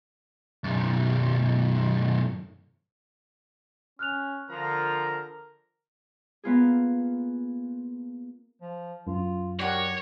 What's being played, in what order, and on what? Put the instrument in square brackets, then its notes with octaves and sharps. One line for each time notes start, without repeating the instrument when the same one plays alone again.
[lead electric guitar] B1 F#2
[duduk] C#4 [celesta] F6 F#6 F7
[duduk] D3 [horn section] F3 A#5 [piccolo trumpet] A#4
[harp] A#3 B3 F4 G#4
[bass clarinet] F3
[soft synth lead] F#2 [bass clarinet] F4
[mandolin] D4 F#4 A#4 [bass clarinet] G4 [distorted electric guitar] C#5